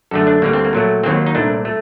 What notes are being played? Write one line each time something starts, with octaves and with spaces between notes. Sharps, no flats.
F#2 D3 A3 A4
D4
D2 D3 G3 A#3
C4
A#3
A#2 F#3 A3
D#2 D#3 F#3 A#3 C4
D#4
C2 A#2 A3 D4
A3